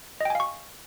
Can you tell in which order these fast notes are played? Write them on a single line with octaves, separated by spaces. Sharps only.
D#5 G5 G#5 F5 C#6